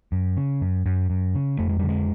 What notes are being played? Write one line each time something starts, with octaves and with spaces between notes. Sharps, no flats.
F#2
C#3
F#2
F#2
F#2
C#3
F2 A3
G#3
G3
D3
G#3